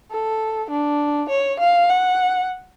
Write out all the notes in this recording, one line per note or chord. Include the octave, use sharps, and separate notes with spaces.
A4
D4
C#5
F5
F#5